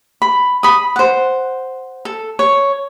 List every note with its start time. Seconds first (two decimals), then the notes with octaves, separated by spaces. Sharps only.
0.22 B5
0.63 B5 D#6
0.96 C5 F#5
2.05 A4
2.39 C#5